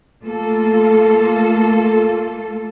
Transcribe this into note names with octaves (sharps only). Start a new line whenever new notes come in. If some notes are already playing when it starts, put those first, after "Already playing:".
A3 A#3 F4 A4